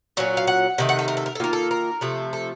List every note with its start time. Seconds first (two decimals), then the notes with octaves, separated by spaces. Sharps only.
0.17 A#2 F#3 C#4
0.37 F5
0.47 F#5
0.78 C3 D#3 A3
0.89 F#5
0.99 A4
1.08 A#4
1.17 A4
1.26 A#4
1.35 A4
1.40 D#3 A#3 F4 A#4
1.53 A4
1.71 A#4
2.01 C3 F3 A3 A4
2.33 A4